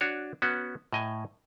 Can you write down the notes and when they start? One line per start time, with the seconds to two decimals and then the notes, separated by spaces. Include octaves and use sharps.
0.01 D4 F#4 C#5
0.42 B3 C#4 F#4
0.93 A2 D#5 G#5